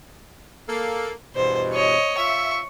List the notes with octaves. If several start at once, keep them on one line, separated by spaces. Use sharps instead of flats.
A#3 A4
E2 G2 B2 C5
C#5 D#5
F4 E5 C#6